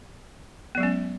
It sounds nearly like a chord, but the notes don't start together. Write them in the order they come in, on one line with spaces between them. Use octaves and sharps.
B3 F#3 G#3 C#4